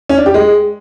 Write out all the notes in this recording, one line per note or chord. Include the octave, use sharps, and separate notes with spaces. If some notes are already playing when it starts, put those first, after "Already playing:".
C#4
D4
G4
G#3